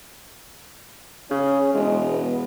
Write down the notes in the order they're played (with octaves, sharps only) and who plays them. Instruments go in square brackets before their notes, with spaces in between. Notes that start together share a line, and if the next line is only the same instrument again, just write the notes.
[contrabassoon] C#3 [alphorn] C#4
[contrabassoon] E1 [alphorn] G#3
[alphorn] B3